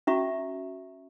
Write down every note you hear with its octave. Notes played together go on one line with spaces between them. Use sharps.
C#4 F#4 E5 A#5 C#6